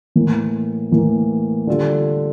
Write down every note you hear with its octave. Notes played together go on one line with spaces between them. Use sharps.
A2 E3 A#3
A2 E3 A#3
D3 G3 D4 F4 A4